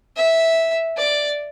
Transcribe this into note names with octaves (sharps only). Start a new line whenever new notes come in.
E5
D5